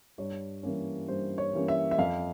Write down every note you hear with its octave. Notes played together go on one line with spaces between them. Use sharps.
G2 C#5
E3 G3 A#3 C#4
G2 C5
C#5
E3 G3 A#3 C#4
E5
E5
F2 F5